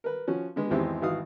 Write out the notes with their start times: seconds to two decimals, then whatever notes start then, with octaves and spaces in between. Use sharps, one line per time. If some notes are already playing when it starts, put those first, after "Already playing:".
0.04 A#4 B4
0.27 F3 C#4 F#4
0.56 D3 G#3 B3
0.71 G#1 E2 G#3 C4 E4 G4
1.02 G#1 E3 F#4 F5 D#6